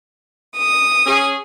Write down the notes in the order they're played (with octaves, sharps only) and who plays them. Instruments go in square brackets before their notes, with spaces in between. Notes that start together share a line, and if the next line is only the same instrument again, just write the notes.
[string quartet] D#6
[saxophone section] C#4 G#4